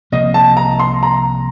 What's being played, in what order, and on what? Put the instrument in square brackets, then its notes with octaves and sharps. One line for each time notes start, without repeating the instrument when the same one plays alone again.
[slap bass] C2 C3 F3 A#3 [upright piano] D#5
[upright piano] A5
A#5
C6
A#5